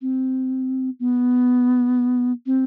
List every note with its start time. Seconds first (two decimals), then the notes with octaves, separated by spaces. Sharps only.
0.02 C4
1.00 B3
2.46 C4